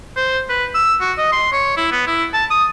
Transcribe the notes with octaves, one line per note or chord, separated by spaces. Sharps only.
C5
B4
E6
F#4
D#5
C6
C#5
E4
B3
E4
A5
D#6